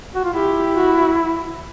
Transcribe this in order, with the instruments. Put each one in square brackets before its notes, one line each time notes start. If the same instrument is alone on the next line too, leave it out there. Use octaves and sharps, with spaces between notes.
[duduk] F#4
F4
[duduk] E4 [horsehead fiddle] G4
[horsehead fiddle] F#4